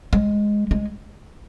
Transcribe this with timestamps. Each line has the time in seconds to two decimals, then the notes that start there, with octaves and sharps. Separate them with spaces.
0.13 G#3
0.71 G#3